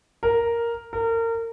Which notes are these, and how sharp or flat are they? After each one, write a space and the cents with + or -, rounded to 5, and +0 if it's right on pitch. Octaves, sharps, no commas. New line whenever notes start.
A#4 +0
A#4 -30